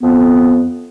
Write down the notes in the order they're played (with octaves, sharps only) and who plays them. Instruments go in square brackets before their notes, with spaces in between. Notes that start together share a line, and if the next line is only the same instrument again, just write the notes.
[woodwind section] F2 B3